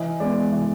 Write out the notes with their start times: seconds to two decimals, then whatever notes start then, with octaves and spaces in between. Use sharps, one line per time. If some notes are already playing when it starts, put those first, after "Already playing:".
Already playing: E3 D#5
0.20 G#3 B3 D5
0.52 E3